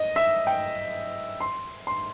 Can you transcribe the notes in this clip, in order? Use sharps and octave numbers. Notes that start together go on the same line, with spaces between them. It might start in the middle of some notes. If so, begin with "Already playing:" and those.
Already playing: D#5
E5
G5
C6
C6